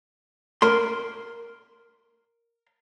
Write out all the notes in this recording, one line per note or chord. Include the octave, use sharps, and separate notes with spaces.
A#4 C6